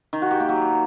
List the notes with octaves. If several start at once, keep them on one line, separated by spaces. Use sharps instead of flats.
D#3
F#4
G4
A#3
F#3